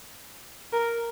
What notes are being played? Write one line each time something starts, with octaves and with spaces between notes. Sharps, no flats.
A#4